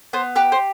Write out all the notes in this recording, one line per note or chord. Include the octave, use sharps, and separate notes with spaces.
B3 C5
G4 B4
C5